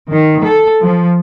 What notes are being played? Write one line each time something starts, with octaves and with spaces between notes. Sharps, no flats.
D#3
A4
F3